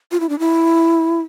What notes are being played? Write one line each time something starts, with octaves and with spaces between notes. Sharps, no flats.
F4
E4
D4
E4